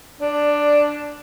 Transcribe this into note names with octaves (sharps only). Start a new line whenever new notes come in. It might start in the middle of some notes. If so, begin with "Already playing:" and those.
D4 D5